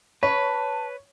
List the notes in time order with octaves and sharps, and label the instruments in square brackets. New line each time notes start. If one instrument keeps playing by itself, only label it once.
[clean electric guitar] B4 [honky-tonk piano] C#5 [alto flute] A5